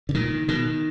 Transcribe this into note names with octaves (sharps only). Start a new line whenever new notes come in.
D3
A#2 D#3
B2 D#3